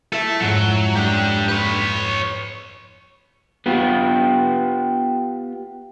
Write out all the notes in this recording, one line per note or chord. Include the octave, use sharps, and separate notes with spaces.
E4 A4 E5 C7
F2 G#2 F#3 C#4
D4 G4
B4 C#5
D#7
B3 F4 G4